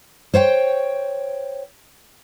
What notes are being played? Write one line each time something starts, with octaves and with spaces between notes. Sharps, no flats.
C5 C#5 F5 G5